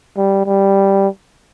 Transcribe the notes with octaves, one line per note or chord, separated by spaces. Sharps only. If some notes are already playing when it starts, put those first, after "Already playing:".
G3
G3